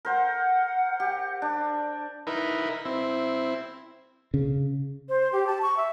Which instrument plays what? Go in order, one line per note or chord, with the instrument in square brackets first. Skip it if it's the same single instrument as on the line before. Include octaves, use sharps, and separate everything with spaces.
[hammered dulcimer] A#4 C5 G5 [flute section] F#5
[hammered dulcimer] G4
D4
[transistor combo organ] D#4 E4 A#4 B4
C4 E4
[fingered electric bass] C#3
[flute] C5
G4
A5
C#6
E5